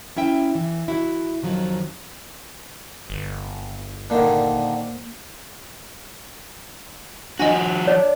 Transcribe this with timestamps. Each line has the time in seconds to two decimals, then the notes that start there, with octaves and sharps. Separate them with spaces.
0.16 C#4 E4 E5 G5
0.55 E3
0.88 E4 F#4
1.42 F2 D#3 F3 F#3
3.10 G1
4.10 A#2 D3 D#3 A#3 C5
7.40 F3 D4 F#4 D#5 G#5 A#6
7.87 D4 C#5